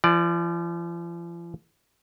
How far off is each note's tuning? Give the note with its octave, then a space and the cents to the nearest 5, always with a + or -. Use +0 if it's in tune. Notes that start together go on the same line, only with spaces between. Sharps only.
F3 -45 D5 +10